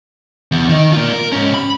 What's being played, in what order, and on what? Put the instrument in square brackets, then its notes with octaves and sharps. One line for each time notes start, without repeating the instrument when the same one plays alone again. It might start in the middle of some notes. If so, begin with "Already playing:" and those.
[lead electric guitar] E2
D#3 D#4
A#3 F4
A#4
G#2 C#4
B5